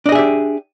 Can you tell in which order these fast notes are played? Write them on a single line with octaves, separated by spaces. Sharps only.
D4 D#5 G#4 E5 G4